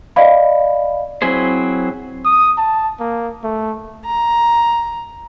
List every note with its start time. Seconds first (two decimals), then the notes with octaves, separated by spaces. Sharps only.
0.16 D5 D#5 F5 B5
1.22 F#3 C4 E4 G#4 C5
2.25 D#6
2.58 A5
3.00 A#3
3.44 A3
4.05 A#5